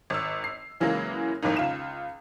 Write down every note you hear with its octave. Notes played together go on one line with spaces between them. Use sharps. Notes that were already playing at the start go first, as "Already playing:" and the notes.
G#1 E6
C7
C#3 E3 F#3 G#3 A#3
G#1 F2 A2 A#3 D#4
C#2 F4 E7